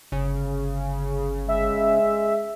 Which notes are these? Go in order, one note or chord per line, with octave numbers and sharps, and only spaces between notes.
G1 C#3
G#3 E5